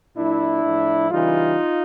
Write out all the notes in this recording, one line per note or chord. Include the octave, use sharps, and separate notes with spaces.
A#2 F#3 D4 E4
A2 F3
C#3 E3 G3 D#4 F4